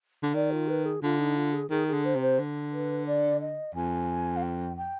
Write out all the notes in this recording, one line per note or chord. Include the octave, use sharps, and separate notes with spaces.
D3
D#3 D5
F4
B4
G#4
D3 F4
D#4
F4
G#4
D#3 G#4
G#4
D3
C5
C3
C5
D3
B4
D5
D#5
F2 G#5
F5
G5
G5